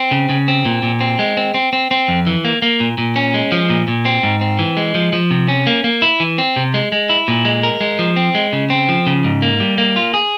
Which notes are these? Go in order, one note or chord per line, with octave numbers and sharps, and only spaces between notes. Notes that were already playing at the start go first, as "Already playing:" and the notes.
Already playing: C4
C#3
C#3
C4
A#2
A#2
C4
G#3
C4
C4
C4
C4
F2
E3
A#3
A#3
A#2
A#2
C#4
G#3
F3
A#2
A#2
C4
G#2
C4
E3
G#3
F3
F3
C3
C#4
A#3
A#3
E4
E3
C4
C3
G#3
G#3
E4
A#2
G#3
A#4
G#3
F3
C4
G#3
C#3
C4
F3
C#3
G#2
A#3
G3
A#3
F4
G#4